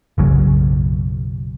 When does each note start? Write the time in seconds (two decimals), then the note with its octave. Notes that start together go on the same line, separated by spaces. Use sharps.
0.18 F#1 B1 C#3 F#3